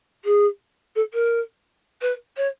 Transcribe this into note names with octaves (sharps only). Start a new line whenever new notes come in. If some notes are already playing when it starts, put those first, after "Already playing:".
G#4
A4
A#4
B4
C#5